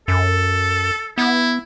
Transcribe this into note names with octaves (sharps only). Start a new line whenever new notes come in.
F#2 A4
B3 E4